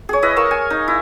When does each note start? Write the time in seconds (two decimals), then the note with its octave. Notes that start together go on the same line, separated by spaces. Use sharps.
0.09 G#4 C#5
0.22 E4 B4 D#5
0.36 A#4 F5 C#6 E6
0.51 G#5
0.70 D#4
0.88 E4